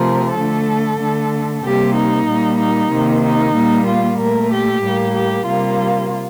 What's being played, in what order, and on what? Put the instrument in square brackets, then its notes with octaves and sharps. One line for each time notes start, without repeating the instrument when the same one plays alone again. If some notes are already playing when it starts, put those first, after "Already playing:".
Already playing: [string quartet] C3 F3 A3 A#4
D3 A3 A4
D3 A3
C3 G3 A#3 G4
D#4
A#2 G3 A#3
D#4
C3 D#3 A#3
D#4
A#2 G3 A#3
F4
A#2 A3 A#4
G4
A2 G3 A#3
G4
C3 G3 A#3 F4